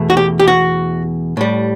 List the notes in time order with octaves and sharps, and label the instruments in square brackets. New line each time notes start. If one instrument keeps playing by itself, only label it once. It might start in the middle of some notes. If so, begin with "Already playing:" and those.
Already playing: [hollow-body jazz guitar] E2 B2 A3
F#4
G4
G4
F#4
A2 G3